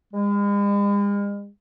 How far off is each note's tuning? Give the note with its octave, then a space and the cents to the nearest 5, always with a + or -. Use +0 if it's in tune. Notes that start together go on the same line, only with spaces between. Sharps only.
G#3 -45